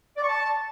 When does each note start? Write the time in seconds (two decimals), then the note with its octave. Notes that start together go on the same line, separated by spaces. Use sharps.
0.17 D5
0.22 C#6
0.28 A5